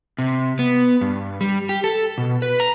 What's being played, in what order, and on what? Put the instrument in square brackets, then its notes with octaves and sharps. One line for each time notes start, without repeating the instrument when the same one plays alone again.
[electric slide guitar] C3
B3
G2
G3
G4
A4
B2
B4
A#5